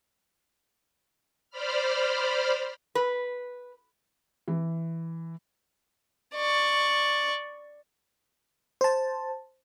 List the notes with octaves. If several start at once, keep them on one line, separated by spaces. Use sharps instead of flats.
C5 D5 B5 F6
B4
E3
D5 C#6
C5 A5